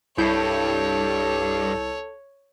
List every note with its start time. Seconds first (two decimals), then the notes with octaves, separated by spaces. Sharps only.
0.18 C2 G2 E4 A4 C#5 G6